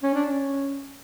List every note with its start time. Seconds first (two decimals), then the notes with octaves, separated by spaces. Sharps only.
0.03 C#4
0.14 D4
0.25 C#4